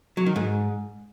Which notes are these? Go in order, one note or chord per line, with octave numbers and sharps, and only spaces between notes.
F#3
D#3
G#2